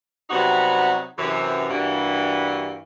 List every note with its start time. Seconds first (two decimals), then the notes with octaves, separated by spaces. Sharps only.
0.30 C3 F#3 G3 B3 D#4 F#4
1.18 F#2 C3 E3
1.70 G2 E3 G3 A#3 F#4